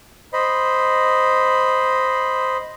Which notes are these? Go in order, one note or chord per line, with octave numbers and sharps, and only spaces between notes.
C5 D#5 B5